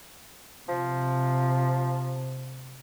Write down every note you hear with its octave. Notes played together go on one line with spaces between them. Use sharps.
C3 F3